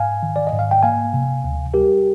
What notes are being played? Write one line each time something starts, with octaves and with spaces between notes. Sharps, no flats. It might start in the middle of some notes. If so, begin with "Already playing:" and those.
Already playing: G#2 F5 G#5
D#3
D5
D#5
G#2
F5
G5
A#3 F5 G#5
C3
D2
G3 G4 A#4